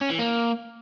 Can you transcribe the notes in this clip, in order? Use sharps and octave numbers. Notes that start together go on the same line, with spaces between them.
C#4
E3
A#3